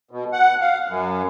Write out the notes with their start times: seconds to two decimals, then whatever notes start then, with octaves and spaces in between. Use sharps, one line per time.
0.11 B2
0.33 F#5
0.61 F5
0.88 F#2